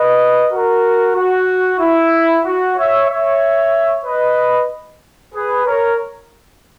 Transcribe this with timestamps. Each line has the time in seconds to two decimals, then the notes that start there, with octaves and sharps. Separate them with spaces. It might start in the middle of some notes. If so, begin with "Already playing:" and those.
Already playing: B4 D#5
0.52 F#4 A#4
1.15 F#4
1.80 E4
2.44 F#4
2.76 C#5 E5
3.09 C#5 E5
4.05 B4 D#5
5.33 G#4 B4
5.65 A#4 C#5